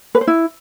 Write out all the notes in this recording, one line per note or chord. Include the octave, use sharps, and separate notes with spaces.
B4
C5
E4